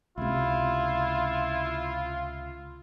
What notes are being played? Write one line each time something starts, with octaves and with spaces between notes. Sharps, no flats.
C#2 C3 E4 F4